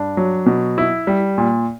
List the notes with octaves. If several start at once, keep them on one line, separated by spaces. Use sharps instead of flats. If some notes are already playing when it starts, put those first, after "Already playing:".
Already playing: G2 D4
F#3
B2
E4
G3
A#2